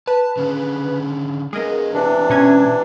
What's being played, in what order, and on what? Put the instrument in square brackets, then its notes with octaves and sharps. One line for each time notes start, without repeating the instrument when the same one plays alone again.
[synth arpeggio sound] B4 [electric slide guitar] A5
[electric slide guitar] D3 C#4 G#4
[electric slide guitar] G#3 B3 [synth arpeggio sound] G#4 A#4 D#5
[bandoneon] C3 E3 D4
[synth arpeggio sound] B2 C#4 G#6